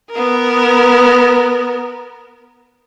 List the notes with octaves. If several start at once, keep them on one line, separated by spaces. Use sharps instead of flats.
B3 A#4